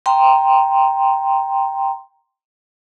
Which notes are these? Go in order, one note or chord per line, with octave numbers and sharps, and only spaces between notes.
G5 A#5 C6